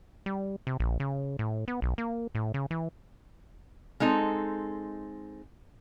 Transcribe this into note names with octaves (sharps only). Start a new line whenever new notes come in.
G3
C3
A#1
C#3
A2
B3
B1
A#3
A2
C#3
E3
G#3 C4 D#4 A4